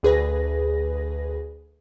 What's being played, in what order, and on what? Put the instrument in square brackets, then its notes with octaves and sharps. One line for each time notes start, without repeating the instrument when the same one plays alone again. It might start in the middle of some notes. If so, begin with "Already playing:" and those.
[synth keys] D2 G#4 B4 A#6